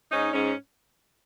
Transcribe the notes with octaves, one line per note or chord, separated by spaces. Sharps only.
G#2 C#4 D#4
G#2 C#4